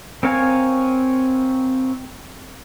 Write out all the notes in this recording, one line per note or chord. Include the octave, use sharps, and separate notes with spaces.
C4 A#4 C#5 F5 G#5